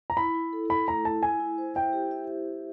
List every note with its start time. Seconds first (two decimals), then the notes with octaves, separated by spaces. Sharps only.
0.10 A#5
0.17 E4 B5
0.34 E4
0.53 A4
0.70 E4 B5
0.87 A3 A#5
1.05 E4 A5
1.23 E4 G#5
1.40 E4
1.58 C5
1.75 E5 G5
1.93 G4
2.11 E5